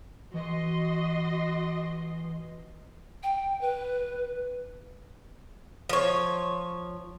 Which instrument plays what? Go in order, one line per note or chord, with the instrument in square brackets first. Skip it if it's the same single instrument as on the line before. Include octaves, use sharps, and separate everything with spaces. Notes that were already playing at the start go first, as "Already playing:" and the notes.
[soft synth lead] E3 [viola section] F#4 D#5 C6
[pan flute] G5
B4
[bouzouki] F3 C#5